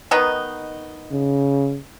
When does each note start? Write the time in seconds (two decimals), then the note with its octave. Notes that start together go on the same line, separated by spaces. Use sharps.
0.11 D#3 B3 D#4
1.12 C#3